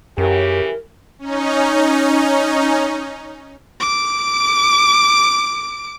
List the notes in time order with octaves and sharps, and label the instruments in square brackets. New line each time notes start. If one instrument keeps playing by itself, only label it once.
[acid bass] F#2 [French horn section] C#3 E3 G4 [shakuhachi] A#4
[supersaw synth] C#4 D#4
[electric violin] D6 D7